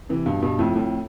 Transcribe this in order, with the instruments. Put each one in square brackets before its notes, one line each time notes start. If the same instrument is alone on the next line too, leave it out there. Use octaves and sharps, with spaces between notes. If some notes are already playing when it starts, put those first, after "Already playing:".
[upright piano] C3 E3
G2 B2
G2 B2
F2 A2
F2 A2